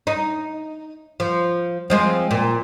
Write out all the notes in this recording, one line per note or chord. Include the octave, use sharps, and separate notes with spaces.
D#4
F3
F3 G#3 C4
A#2